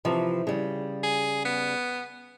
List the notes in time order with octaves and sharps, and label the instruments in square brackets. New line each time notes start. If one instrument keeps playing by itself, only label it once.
[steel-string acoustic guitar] C3 E3 F3
C#3 G3
[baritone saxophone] G#4
B3